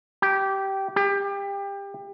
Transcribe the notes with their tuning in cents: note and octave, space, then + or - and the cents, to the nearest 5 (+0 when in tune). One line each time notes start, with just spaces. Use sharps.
G4 -15
G4 +25